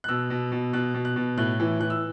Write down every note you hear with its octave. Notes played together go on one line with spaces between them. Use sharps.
F#6
B2 E6
B2
B2
B2 F#6
B2
F#6
B2
A2 F#6
E3
E3 F#6
E6